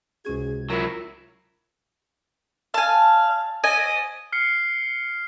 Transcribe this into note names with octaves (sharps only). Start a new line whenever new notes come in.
C#2 C3 C#4 F#4 G#4 G#6
F#3 E4 F4 A#4
F5 G#5 A5
D#5 G#5
F6 C7 C#7